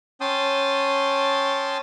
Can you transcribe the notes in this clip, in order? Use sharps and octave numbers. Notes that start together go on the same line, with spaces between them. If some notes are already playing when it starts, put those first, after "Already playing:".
C#4 G5 A5 C6 D#6